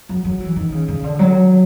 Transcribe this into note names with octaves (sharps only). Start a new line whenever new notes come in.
F#3
F#3
E3
D#3
C#3
C#3
D3
F#3